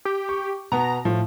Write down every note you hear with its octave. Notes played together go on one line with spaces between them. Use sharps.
G4
C#6
B2 B3 A#5
A2 F3